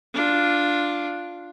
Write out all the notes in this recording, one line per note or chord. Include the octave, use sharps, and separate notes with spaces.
D4 F4